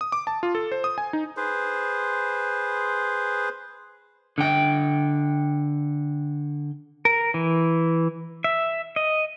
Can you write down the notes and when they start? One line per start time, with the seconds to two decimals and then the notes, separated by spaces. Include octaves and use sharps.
0.01 D#6
0.12 D6
0.27 A5
0.43 F4
0.55 A4
0.72 C5
0.84 D#6
0.98 G#5
1.13 D#4
1.37 G#4 B4 C5
4.38 D3 G5
7.05 A#4
7.34 E3
8.44 E5
8.96 D#5